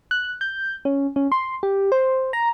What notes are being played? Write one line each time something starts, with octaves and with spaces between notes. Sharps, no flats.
F#6
G6
C#4
C#4
C6
G4
C5
A#5